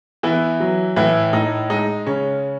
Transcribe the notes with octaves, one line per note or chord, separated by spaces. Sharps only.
E3 B3 E4
F#3
A2 E3 E4
A2 D#4
G#3 D#4
C#3 C#4